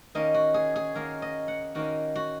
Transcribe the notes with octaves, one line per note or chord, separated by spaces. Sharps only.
D#3 A#3 C#4 D#5
F#4
G#4
G#4
D#3 A#3 C#4 A#4
D#5
F#5
D#3 A#3 C#4 F#4
F#4